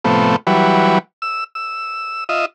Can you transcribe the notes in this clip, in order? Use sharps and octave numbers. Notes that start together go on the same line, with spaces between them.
A2 C3 F3 A3 B3
E3 F#3 G3 B4
E6
E6
F4 D#5 E5